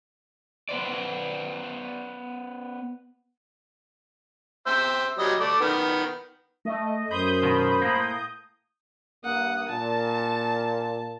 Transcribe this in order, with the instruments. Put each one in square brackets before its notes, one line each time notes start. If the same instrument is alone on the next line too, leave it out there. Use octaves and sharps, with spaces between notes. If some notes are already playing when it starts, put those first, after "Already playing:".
[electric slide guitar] B3 B4 C5 D5
[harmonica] C5 E5
F#3 G3 D#5
A3 D5
D#3 B3
[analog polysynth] A3 [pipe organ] D#5
[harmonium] F#2 [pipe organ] C5 B5 [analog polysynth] D#6 G6
[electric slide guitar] B2 D#3
A2 A#3
[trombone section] G2 A#3 [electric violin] F#5 D#6
[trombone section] A#2 [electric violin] A5